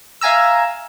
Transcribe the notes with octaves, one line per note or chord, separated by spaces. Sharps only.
E5 F5 G#5 A#5 E6